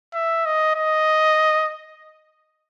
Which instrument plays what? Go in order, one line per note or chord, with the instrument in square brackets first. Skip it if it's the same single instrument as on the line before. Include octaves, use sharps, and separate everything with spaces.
[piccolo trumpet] E5
D#5
D#5